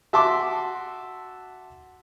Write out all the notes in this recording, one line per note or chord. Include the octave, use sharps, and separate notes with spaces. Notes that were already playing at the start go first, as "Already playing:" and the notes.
F#4 E5 A5 C6 D6